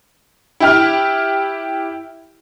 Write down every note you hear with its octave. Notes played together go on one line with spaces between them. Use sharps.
E4 G4 F6